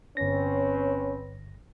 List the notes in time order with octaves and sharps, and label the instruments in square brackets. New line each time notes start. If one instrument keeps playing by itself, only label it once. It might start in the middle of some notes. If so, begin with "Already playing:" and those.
[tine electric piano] G1 A#6 [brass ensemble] C4 B4 C#5 [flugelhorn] C#4